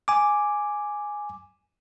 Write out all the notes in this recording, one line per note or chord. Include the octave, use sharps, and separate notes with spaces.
G#5 D6